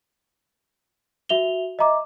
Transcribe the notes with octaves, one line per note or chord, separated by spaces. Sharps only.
F#4 E5 F7 G7
D#5 E5 A#5 D6